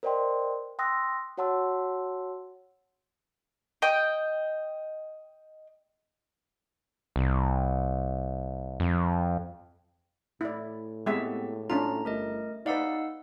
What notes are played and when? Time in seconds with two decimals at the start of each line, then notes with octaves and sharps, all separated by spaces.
0.03 A#4 C5 D5 D#5 G5 C6
0.79 G5 C6 D#6 E6 F#6 A#6
1.38 F#4 C#5 F#5 A5 C6 E6
3.82 D#5 G5
7.16 C2
8.80 F2
10.41 A2 E4 D5
11.06 G#3 B3 C4 G4 G#4 E5
11.70 C#4 D4 F4 A#5
12.05 G1 A3 A#4 D#5
12.66 D#4 B4 D5 F5 F#5 E6